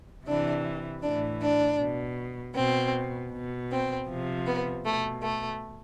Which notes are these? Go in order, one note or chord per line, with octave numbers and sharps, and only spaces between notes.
C3 E3 D4
A2 E3 D4
D4
B2
B2 C4
B2
C4
C3 F3
B3
B2 A3
A3